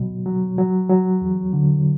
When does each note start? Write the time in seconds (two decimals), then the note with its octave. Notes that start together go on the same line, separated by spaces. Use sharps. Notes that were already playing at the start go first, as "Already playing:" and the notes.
Already playing: B2 F#3
0.26 F#3
0.58 F#3
0.89 F#3
1.21 E2
1.53 D3